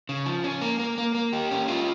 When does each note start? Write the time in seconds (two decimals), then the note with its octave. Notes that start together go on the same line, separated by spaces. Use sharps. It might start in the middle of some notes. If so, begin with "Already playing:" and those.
0.09 C#3
0.26 F3
0.44 C#4
0.61 A#3
0.80 A#3
0.98 A#3
1.15 A#3
1.33 G4
1.51 C#4
1.68 F4